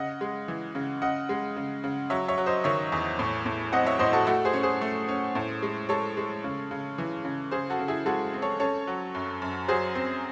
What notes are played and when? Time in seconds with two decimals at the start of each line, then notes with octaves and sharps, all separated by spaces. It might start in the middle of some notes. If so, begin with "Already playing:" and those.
Already playing: C#3 D#5 F#5
0.21 G#3
0.48 E3
0.75 C#3
1.02 C#3 D#5 F#5
1.29 G#3
1.56 C#3
1.84 C#3
2.10 F#3 C#5 E5
2.28 C#5 E5
2.38 F#3
2.46 C5 D#5
2.64 D#3 C#5 E5
2.92 E2
3.19 A2
3.46 A2
3.72 C4 D#5 F#5
3.87 C#5 E5
3.99 A2 C5 D#5
4.13 F#4 A4
4.27 A3 F#4 A4
4.45 G#4 C5
4.53 C#4
4.63 G#4 C5
4.81 A3
5.09 C#4
5.35 A2
5.63 G#3
5.89 G#3 A4 C#5
6.17 G#3
6.44 C#3
6.71 C#3
6.98 E3
7.25 C#3
7.51 C#3 G#4 C5
7.70 F#4 A4
7.79 C#3
7.88 E4 G#4
8.06 G#3 F#4 A4
8.33 C4
8.42 A4 C#5
8.60 C#4 A4 C#5
8.87 F#3
9.15 F#2
9.42 F#2
9.68 F#3 G#4 C5
9.95 C4